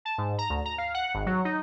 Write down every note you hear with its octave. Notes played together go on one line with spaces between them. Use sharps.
A5
G#2
A#5
D2
A#5
F5
F#5
G#1
F#3
D#4